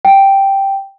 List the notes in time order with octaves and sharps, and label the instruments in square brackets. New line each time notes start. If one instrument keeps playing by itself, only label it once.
[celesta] G5